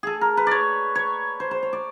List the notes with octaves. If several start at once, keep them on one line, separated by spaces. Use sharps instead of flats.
G#4 A4
A#4
B4
C#5 D5
C#5
C5
C5
C#5
D5